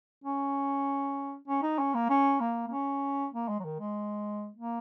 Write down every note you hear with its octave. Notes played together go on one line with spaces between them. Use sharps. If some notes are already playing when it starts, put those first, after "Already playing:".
C#4
C#4
D#4
C#4
A#3
C#4
A#3
A#3
C#4
A#3
G#3
F#3
D#3
G#3
A#3